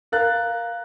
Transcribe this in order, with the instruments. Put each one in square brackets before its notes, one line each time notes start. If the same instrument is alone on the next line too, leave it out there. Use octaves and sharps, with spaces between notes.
[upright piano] A#4 F5 F#6 A6